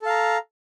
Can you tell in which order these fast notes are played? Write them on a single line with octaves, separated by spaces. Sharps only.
A4 F5 A#5